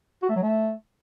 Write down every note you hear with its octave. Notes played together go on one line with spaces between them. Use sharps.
F#4
A3
F#3
A3